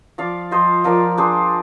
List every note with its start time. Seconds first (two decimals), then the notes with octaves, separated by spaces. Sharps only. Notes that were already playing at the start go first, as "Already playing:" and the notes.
0.18 F3 D5 F5
0.51 F3 C5 D#5
0.84 F3 A#4 D5
1.18 D4 G#4 C5